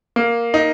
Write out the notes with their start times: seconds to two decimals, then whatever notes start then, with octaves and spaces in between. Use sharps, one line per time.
0.16 A#3
0.54 D#4